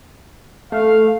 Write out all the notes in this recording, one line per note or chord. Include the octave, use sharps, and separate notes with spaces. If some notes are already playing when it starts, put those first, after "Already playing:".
A3 F5